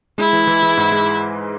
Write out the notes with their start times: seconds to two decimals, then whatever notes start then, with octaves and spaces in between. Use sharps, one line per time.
0.18 G#3 E4
0.33 E3
0.47 E3
0.63 E3
0.77 G#2
0.92 G#3